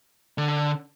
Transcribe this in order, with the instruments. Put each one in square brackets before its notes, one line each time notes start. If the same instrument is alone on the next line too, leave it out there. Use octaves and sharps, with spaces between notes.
[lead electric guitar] D3